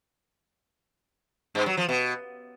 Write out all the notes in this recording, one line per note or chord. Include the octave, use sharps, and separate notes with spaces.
G2
F#3
F3
B2